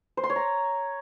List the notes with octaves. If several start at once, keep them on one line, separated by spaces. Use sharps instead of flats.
C5
C6
C#5
A#5